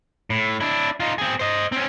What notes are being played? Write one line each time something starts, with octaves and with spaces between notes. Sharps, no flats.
A2
D4 E4
D#4 F4
C4 G#4
C5 D#5
C4 C#4